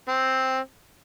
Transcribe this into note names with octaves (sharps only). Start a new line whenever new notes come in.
C4